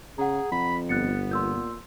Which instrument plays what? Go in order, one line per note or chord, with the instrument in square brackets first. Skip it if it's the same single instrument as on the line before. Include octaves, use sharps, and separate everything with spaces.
[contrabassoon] C#3 [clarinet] G#4 [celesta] F#5 A#5
[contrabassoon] F2 [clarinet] B5
[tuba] G1 [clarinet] B3 [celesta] F#6 A6 C#7
[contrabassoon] A#2 [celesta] C6 E6 G6